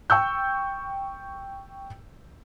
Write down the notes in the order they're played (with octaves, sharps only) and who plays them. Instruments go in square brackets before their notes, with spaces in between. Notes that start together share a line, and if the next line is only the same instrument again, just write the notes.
[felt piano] G5 C#6 E6 G6